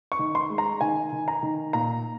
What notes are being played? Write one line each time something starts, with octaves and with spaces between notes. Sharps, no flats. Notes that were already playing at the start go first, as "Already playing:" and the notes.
C#6
D#3
C6
G#3
A#5
D#3 G#5
D#3
A#5
D#3
A#2 A#5